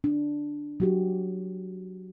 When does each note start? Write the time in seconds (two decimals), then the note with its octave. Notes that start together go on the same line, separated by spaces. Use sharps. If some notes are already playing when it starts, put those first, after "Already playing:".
0.04 D4
0.80 F#3 F#4 G4